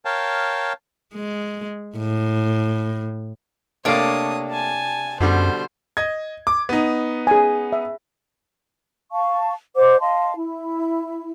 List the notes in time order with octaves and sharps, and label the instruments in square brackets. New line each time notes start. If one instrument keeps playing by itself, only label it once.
[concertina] A#4 C#5 F5 G5 A5
[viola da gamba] G#3
A2
[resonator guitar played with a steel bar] C3 D4 [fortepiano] A3 A#3 F5 [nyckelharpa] C#5 D#6
[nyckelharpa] G#5 A5
[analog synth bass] F#2 [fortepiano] B2 D3 G3 [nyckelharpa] C5
[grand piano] D#5 G#6
D6
B3 D#4
[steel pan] G#4 G#5
E5
[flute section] F5 A5 C#6
C5 D#5 F#5 D6
D#5 F5 A5 C6
E4